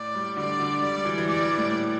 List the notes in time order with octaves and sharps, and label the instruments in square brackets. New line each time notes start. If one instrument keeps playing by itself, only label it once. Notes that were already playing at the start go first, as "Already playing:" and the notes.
Already playing: [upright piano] A2 [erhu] D5
[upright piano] G3
[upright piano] D3 [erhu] D5
[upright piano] D3
[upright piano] G3 [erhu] D5
[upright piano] G3
E3
E3
[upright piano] G3 [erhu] D5
[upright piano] G3
A2